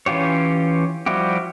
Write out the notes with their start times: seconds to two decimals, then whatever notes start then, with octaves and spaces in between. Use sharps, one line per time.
0.06 E3 C#4 F4 G4 C#5
1.06 F3 G3 E4 F#4 G4